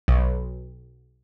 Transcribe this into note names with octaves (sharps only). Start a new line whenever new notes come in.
B1